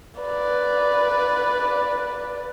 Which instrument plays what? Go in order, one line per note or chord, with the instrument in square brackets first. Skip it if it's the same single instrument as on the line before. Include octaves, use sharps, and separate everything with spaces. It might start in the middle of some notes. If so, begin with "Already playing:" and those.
[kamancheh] B4 D5